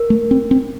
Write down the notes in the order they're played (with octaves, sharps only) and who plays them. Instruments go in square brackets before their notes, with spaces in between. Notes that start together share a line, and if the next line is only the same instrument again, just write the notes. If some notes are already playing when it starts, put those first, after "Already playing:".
Already playing: [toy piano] A#4
[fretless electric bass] A3
C4
C4